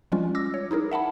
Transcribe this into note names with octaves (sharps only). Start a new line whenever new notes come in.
F3 G3 G#3 C#4 F4
D6 E6 A#6
C#5
D#4 E4 G#4 A#4
E5 F#5 A5 B5